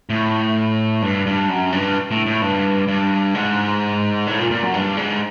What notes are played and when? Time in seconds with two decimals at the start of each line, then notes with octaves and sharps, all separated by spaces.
0.10 A2
1.02 G2
1.26 G2
1.49 F#2
1.72 G2
2.11 A2
2.26 A2
2.42 G2
2.88 G2
3.34 G#2
4.27 A2
4.39 A#2
4.51 A#2
4.63 F#2
4.74 G2
4.97 G#2